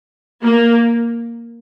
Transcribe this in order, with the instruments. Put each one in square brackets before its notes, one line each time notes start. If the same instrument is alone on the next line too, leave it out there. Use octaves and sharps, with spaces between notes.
[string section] A#3